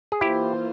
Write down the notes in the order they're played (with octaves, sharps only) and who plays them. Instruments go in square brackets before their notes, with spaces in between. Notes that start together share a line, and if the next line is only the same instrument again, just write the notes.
[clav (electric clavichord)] G#4
[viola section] E3 A#3 F4 C5 [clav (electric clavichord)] E4 G4